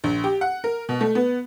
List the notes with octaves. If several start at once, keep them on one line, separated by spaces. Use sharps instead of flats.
A#1
G4
F#5
A#4
B2
A3
B3